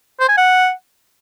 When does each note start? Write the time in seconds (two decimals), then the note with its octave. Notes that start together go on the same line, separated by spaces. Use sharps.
0.20 C5
0.29 G#5
0.37 F#5